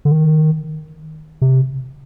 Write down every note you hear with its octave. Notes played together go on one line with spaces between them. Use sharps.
D3
D#3
C3